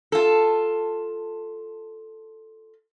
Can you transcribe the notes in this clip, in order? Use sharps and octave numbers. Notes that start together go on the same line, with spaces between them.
F4 A4